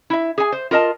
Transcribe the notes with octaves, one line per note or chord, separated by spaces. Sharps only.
E4 E5
G#4 G#5
C5
F4 A#4 D#5 A5